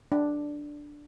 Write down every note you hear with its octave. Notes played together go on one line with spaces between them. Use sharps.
D4